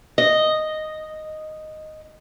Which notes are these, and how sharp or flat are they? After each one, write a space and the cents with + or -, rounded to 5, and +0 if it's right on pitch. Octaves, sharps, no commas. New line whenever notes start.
D#5 -5